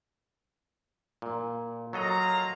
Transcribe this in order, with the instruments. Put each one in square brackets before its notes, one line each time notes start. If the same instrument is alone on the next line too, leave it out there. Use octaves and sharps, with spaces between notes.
[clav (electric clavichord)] A#2
[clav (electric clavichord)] F#3 A4 D#5 [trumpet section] A#3 F4 A#5